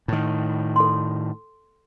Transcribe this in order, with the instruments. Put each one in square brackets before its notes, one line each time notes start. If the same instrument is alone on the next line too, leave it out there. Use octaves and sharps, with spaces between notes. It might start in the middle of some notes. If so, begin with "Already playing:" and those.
[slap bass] A2 D#3
[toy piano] A4 C6